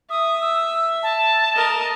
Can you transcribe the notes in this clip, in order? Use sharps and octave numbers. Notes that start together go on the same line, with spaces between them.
E5 D#6
E6
A5
A#4 D#5